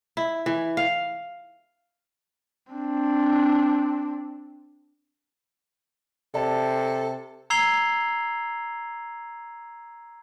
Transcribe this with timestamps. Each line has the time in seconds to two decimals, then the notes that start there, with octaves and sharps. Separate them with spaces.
0.17 E4
0.46 E3
0.77 F5
2.73 C4 D4
6.35 C3 A4 D5 A5
7.50 A#5 E6 G#6 C7 F7 G7